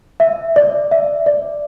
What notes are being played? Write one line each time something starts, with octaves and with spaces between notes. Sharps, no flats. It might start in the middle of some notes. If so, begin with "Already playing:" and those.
E5
D5
E5
D5